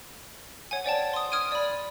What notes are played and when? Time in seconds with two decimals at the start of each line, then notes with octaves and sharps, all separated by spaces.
0.71 C#5 F#5 G#5
0.84 C5 D5 G5 A5
1.13 C6 D#6
1.32 D#6 F6 G#6 D7 D#7
1.52 D5 B5